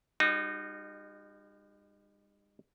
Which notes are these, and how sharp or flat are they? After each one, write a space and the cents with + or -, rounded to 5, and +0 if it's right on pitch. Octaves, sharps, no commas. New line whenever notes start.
G3 +45 D#4 -25 F#4 +0